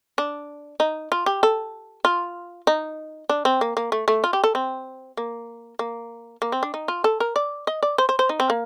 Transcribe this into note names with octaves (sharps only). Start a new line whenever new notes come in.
D4
D#4
F4
G4
A4
F4
D#4
D4
C4
A#3
A#3
A3
A3
F4
G4
A4
C4
A#3
A#3
A#3
C4
D4
D#4
F4
A4
A#4
D5
D#5
D5
C5
C5
C5
D#4
C4
A#3